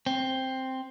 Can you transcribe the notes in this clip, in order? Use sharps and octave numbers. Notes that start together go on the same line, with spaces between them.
C4